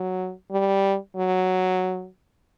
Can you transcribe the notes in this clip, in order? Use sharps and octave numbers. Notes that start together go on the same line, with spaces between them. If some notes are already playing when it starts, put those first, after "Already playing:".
Already playing: F#3
G3
F#3